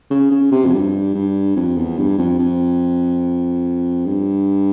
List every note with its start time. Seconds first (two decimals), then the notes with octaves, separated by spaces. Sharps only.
0.11 C#3
0.31 C#3
0.52 C3
0.66 F2
0.73 G2
1.15 G2
1.56 F2
1.77 E2
1.98 G2
2.18 F2
2.39 F2
4.06 G2